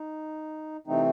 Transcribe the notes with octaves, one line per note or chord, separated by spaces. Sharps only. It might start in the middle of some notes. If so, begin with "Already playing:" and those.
Already playing: D#4
C3 E3 A3 C4 D#4